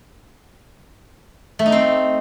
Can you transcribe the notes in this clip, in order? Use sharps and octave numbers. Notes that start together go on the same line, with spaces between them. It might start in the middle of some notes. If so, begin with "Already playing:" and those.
A3
D#4
C4